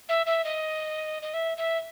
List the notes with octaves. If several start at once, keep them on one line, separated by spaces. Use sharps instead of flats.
E5
E5
D#5
D#5
E5
E5